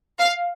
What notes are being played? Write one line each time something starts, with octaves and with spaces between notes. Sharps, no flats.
F5